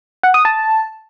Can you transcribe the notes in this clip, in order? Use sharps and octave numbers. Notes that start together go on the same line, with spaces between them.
F#5
D#6
A5